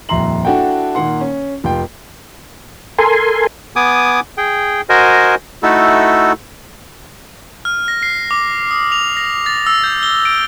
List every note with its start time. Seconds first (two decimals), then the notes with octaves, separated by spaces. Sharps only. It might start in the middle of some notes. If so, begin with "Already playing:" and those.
0.09 D#1 F2 E5 A#5 C6 F#7
0.45 D4 E4 F#4 A4 F#5 G5
0.95 A#2 D#3 A#3 F#5 C6
1.21 C#4
1.64 F1 F4 G5
2.99 A4 A#4 G#5 C6
3.76 B3 G#5 D6 D#6
4.38 G#4 G5
4.89 F#4 A#4 C5 D#5 G#5
5.63 A3 D#4 E4 F#4 A4
7.65 F6
7.88 A#6
8.03 C7
8.31 D6
8.71 D#6
8.92 F7
9.17 A#6
9.46 A6
9.66 E6
9.84 G6
10.03 G7
10.25 D7